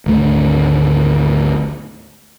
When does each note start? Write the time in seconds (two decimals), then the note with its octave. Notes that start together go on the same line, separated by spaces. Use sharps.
0.06 G#1 D2 A3